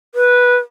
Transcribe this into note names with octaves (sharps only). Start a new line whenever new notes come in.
B4